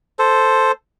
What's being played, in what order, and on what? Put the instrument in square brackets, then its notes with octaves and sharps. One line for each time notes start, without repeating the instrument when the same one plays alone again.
[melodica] A4 C5